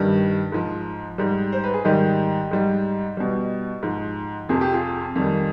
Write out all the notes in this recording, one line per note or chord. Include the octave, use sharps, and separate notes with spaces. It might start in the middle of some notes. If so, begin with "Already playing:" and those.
Already playing: G2 D#3 G3
G#2 F3
G#2 G3
C5
B4
G#4
G#2 D#3 G3 D#4 G4
G#2 G3
B2 G3
G#2 F3
F2 C3 F3 G#4
G4
F4 G#4
F2 D#3 G3